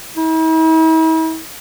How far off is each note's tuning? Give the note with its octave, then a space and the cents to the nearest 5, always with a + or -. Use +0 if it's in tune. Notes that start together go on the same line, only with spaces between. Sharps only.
E4 -45